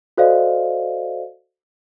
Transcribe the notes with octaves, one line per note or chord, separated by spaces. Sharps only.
F#4 A4 C5 D5 D#5 F5